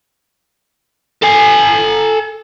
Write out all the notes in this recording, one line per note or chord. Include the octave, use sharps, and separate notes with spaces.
A4 G#5